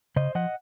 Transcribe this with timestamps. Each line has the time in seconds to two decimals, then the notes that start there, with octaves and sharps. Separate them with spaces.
0.16 C#3 C5 D#5
0.35 F3 D#5 F#5